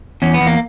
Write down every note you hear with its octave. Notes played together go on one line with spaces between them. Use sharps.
E2 C#4
B3
E2
A#3